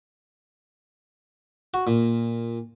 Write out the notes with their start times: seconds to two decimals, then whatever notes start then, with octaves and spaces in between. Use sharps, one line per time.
1.74 F#4
1.87 A#2